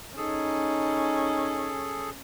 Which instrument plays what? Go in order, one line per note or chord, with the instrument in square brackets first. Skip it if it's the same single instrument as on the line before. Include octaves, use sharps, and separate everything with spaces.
[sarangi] C#4 [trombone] D#4 [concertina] G#4 A4